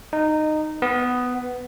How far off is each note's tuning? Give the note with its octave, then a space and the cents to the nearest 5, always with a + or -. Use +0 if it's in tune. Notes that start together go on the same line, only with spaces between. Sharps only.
D#4 -15
B3 +10